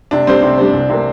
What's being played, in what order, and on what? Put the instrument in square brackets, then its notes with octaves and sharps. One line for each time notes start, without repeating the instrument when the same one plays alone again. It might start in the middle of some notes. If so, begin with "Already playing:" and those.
[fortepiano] C3 [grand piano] D4
[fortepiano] G3 D4 G4 C5 [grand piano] C4
[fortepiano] C3
G3 D4 G4 C5
C2
C3 A#3